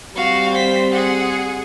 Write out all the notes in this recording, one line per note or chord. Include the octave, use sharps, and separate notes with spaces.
G3 C4 F#4 F5
C5 B6
G#4 F#5